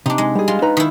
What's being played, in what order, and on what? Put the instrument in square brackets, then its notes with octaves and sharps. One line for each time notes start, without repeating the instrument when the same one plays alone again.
[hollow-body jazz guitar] C3 [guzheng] D4 D#4
[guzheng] G#3
[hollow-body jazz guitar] G3 G#4
[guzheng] G#3 F4
[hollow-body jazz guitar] D#4 B4 A#5
[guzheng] D#3 E4